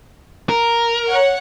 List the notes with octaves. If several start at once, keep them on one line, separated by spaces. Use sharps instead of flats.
A#4
C#5 F#5